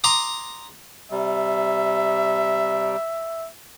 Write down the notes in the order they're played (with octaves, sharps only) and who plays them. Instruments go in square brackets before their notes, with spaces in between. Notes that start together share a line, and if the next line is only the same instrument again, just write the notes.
[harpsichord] A#5 C6 D6 D#6
[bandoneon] C3 G3 [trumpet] E5